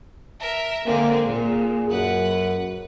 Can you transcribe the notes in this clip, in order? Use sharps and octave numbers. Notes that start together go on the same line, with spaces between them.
A#4 E5
D3 G#3 A#3 C4
A#2 G#4
F#2 B4 F#5